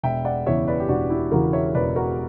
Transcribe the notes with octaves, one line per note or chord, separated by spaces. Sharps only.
E1 E5 G5
D5 F#5
E2 C#3 E3 C#5 E5
B4 D5
G4
E1 D4 F#4
E4 G4
E2 C#3 E3 F#4 A#4
C#5 E5
E1 B4 D5
F#4 A#4